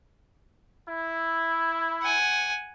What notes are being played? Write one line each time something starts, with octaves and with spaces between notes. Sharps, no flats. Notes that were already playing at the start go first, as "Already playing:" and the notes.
E4
F#5 G#5